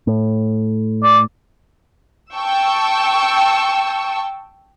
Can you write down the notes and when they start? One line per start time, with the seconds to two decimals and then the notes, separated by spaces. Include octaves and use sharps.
0.07 A2
1.03 D5
2.35 G5 A5 C#6 E6